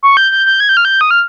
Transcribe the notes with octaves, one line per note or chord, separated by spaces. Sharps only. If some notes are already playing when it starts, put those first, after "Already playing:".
C#6
G6
G6
G6
G#6
G6
F6
G6
D#6
F6